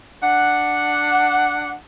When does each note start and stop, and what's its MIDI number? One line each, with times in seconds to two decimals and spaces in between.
0.22 1.73 62
0.22 1.73 78